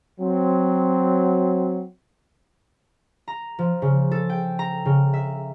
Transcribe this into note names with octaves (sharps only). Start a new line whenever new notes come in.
F#3 C4
A#5
F3
C#3
A4
G5
A#5
C#3
E5